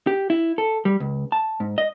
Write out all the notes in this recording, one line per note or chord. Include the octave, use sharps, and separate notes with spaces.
G4
E4
A4
G3
C#2
A5
G#2
D#5